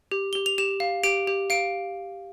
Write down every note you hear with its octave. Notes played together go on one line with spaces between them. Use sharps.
G4
G4 G7
F7
G4 E7
F5
G4 D7
G4
F5 D7